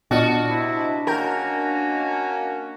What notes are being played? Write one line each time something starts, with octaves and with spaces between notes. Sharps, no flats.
A#2 B3 D4 F#4 D#5 A5 F6
C3 E4
A#3 C#4 F#4 A#4 G5 A#5 G6